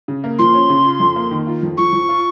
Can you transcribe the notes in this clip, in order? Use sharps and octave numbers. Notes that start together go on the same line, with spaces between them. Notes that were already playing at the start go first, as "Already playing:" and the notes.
C#3
A#3
F3 C6
C#4
C#3
F4
F2
A#3
D#3
F4
F2
F3 C#6
F3
F4